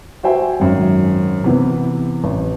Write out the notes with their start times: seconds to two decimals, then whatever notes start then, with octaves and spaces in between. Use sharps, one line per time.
0.23 F#4 C5 E5 G5 G#5
0.60 G#1 F#2
1.44 C3 E3 B3
2.24 A1